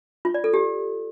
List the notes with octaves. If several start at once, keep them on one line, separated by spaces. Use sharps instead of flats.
F4
D5
A4
G4